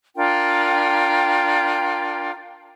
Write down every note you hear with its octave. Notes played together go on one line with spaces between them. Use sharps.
D4 F4 A#4 G5